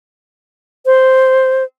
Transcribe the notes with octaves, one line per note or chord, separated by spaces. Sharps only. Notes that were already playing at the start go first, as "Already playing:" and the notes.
C5